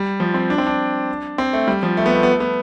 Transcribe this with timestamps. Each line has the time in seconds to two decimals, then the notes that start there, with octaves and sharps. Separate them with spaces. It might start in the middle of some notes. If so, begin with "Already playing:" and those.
Already playing: G3
0.20 F3
0.34 C4
0.50 D4
0.58 C4
0.67 D4
1.38 C4
1.53 A3
1.68 G3
1.83 F3
1.97 A3
2.06 B3
2.14 A3
2.23 B3
2.32 A3
2.40 B3